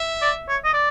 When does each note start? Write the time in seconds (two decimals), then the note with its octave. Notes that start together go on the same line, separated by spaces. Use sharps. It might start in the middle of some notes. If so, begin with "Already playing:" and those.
Already playing: E5
0.22 D5
0.48 C#5
0.64 D#5
0.73 D5